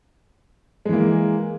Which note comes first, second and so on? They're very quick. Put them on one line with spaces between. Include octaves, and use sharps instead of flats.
G#3 E3 A#3